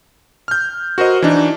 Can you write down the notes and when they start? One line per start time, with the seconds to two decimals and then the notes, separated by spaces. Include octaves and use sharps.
0.48 F6 G6
0.98 F#4 A#4 C5 D#5
1.22 E3 D4 D#4